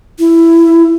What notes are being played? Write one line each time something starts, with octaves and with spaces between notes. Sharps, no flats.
E4